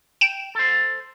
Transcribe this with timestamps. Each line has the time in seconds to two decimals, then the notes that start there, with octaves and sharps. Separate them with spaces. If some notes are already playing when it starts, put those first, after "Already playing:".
0.21 G5 D7 E7
0.55 A4 C5